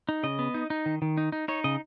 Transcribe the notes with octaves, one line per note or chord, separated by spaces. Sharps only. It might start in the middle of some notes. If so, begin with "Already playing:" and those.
D#4
C#3 D#5
B3
D#4
D#4
D#3
D#3
D#4
D#4
D#4 C#5
C#3 D#5